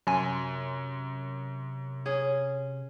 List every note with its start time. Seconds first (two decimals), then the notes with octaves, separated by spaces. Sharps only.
0.07 F#2 C3 F#3 G#5 C6
2.06 C#4 G#4